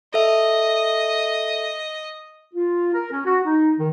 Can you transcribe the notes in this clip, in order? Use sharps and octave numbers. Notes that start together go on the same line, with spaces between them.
A4 D#5 E5
F4
A#4
C#4
F#4
D#4
D#3